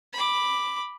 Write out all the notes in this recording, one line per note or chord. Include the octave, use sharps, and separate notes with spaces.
B5 D6